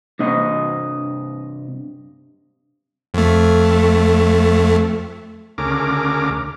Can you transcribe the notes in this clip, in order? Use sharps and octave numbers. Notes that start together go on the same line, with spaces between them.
G2 C3 D#5
F2 A3
D2 C#3 A#4 D6